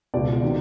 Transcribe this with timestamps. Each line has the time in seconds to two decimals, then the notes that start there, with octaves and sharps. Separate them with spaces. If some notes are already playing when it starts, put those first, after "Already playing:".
0.14 C#2 B2 D5
0.42 C3 D#3